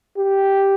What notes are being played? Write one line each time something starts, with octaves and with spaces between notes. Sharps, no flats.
G4